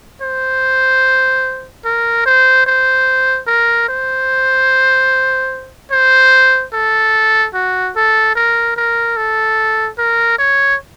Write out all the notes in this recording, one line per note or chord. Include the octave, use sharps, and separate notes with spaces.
C5
A#4
C5
C5
A#4
C5
C5
A4
F#4
A4
A#4
A#4
A4
A#4
C#5